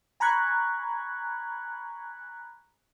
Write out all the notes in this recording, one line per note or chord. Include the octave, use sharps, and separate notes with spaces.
G#5 A#5 B5 C#6 F#6 G#6